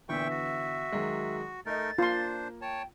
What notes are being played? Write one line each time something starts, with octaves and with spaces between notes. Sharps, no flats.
A#2 D3 E3 B3 E5 G5 C#6
F#4
D#3 F#3 G#3
A3 D#4 A4 A#4 D#5 A6
A#3 D4 F4 C5 C6
C#5 G5 A5